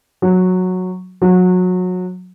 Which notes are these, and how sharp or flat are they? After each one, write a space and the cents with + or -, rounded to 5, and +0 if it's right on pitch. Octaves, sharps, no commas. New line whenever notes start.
F#3 -10
F#3 -25